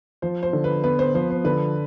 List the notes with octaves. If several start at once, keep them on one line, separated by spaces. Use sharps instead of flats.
F3 C5
C5
D3
B4
B3 B4
C5
F3 C5
C5
D3 B4